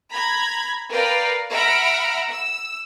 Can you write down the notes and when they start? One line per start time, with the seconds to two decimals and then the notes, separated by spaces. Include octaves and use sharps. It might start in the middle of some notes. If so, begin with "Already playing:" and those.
0.12 A#5 B5 G#6
0.91 A#4 B4 D5 F5 G5
1.51 E5 F#5 A#5 B5 F6 D7
2.31 E6